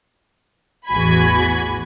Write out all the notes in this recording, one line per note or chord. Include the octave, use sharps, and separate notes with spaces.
A1 E2 F#4 G#5 B5 G#6